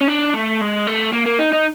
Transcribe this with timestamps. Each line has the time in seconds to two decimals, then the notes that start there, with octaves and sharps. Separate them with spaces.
0.01 C#4
0.08 D4
0.34 A3
0.61 G#3
0.87 A3
1.13 A#3
1.26 A#3
1.39 D#4
1.53 D#4